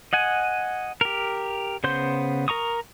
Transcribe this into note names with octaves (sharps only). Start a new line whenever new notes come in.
D#5 F#5 G#5
G4 A#4
C#3 B3 C5 C6 G6
A#4 A#5 C#6 D#6